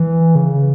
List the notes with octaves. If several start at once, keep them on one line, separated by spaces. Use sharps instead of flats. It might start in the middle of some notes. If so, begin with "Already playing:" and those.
Already playing: E3
C#3